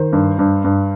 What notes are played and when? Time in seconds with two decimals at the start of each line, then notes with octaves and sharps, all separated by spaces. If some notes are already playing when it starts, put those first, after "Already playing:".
Already playing: D#3 C5
0.13 G2
0.39 G2
0.64 G2